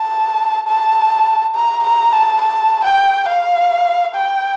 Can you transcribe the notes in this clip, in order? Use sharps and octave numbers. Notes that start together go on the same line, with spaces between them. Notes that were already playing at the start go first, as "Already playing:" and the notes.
Already playing: A5
A5
A#5
A#5
A5
A5
G5
F5
G5